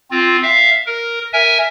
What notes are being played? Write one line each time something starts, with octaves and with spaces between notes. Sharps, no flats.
C4 F4
E5 F5
A#4
A#4 E5 G#5